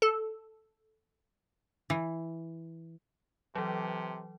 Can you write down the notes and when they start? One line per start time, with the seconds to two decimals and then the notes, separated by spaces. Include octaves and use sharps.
0.02 A4
1.90 E3
3.55 C3 E3 F#3